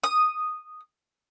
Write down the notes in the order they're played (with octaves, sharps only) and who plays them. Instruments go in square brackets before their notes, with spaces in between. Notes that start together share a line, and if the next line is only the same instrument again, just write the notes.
[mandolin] D#6